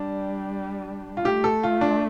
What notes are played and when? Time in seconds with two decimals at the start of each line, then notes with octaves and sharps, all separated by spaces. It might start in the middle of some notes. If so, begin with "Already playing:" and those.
Already playing: G3 D4
1.17 F4
1.24 A3 G4
1.44 A4
1.63 F4
1.81 D4